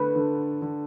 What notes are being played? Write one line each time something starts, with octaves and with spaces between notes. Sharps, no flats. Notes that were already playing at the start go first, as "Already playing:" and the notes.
Already playing: D3 A3 B4
D3
D3